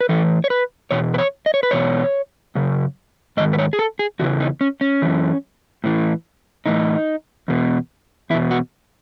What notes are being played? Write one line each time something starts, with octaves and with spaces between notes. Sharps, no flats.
B4
A2 E3 A4
C#5
B4
E2 B2 C#5
B4
C#5
D#5
C#5
B4
E2 B2 C#5
F#2 C#3
G#2 D#3 D#5
B4
C#5
G#4
A4
G#4
E2 C#3 E3 F#4
D#4
C#4
C#4
F#2 E3
A2 E3
A2 E3 D#4
E2 B2
E2 B2 E4
F#4